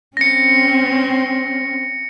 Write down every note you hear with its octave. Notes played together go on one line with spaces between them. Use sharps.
C4 C#4 A#6 C#7